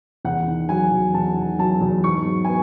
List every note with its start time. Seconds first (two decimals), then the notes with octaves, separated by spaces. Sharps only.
0.25 E2 F#5
0.48 D#3
0.69 F#3 G#5
0.91 E2
1.14 E2 A5
1.36 D#3
1.59 F#3 A5
1.81 E2
2.04 G#2 C#6
2.25 F#3
2.45 G#5
2.48 B3